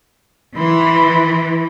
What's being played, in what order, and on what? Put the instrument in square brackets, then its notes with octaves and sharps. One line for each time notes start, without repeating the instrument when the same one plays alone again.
[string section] E3 [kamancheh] B5 C6